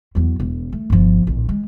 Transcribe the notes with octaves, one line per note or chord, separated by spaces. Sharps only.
E2 F#3
E1
A3
G1 F3
D1 A#1
G#3